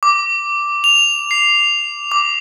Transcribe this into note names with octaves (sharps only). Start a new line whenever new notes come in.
D6
F7
C7
D6